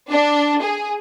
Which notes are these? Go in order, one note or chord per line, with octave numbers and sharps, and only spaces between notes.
D4
G#4